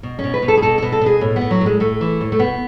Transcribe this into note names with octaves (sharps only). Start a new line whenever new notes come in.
B2
B2 C#4
B4
B2
A4
G#4
B2 A4
B2 A4
A4
B2 G#4
A2
B3
A2
F#3
A2
G#3
A2 A3
E3
A2
A3
B2 B3